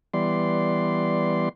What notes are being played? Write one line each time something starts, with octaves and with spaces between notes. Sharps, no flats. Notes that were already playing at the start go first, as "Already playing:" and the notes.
E3 G3 B3 D5 C6